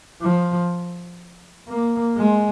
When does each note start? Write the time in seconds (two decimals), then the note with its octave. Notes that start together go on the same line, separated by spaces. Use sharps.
0.21 F3
1.68 A#3
2.17 G#3